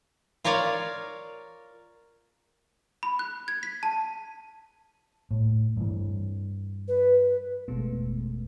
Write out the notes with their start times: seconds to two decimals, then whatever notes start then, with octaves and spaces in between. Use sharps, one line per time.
0.45 F4 A#4 C#5 D5 F5
3.03 B5
3.19 F#6
3.48 G#6
3.63 B6
3.83 A5
5.31 A2
5.77 G2 E3
6.88 B4
7.68 G1 E2 B2 G#3 A3 B3